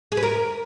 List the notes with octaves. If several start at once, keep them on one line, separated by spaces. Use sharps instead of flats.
G#4
B4
A#4